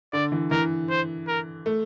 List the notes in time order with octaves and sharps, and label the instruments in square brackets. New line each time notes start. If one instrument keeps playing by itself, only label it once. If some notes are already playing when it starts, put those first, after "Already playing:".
[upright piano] D3 [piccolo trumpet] D5
[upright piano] E3
[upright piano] E3 [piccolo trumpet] A#4
[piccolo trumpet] C5
A#4
[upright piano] A3